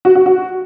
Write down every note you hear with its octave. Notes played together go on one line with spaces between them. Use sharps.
F#4
F#4
F#4